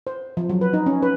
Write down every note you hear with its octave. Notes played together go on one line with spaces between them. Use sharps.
C5
F3
F#3
B4
D#4
C#4
B4